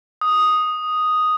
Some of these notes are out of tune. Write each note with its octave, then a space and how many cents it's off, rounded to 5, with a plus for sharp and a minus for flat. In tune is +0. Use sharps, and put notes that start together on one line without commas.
D#6 +0